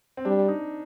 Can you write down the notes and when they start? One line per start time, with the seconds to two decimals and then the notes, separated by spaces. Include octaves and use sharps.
0.17 C4
0.25 G3 D4
0.48 D#4